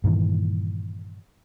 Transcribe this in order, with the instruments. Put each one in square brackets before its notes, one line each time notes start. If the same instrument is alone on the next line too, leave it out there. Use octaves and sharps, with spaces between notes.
[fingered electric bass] G2 A#2 D#3 E3